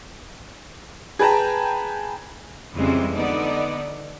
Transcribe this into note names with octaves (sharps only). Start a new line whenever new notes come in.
G#4 B4 G5 A5 A#5
F2 C#3 E3 G3 G#3 C4
D3 B3 D#4 D5